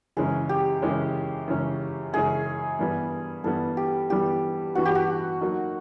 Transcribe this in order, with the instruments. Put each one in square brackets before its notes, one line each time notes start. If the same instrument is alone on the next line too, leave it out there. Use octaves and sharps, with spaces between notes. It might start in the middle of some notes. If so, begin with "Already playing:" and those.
[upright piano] F#2 C#3 E3 G#3 C#4 [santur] G#4
[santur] G4
[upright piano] F#2 C#3 E3 G#3 C#4
F#2 C#3 E3 G#3 C#4
[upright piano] F#2 C#3 E3 G#3 C#4 [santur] G#4
[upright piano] G2 E3 G3 B3
[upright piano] G2 E3 G3 B3 [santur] A4
[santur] G4
[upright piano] G2 E3 G3 B3 [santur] G4
[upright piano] G2 E3 G3 B3 [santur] F#4
[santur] G4
F#4
[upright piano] F#3 A#3 D#4